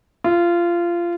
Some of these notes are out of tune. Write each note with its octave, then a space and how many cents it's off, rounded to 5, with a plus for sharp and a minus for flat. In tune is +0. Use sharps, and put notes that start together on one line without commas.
F4 -20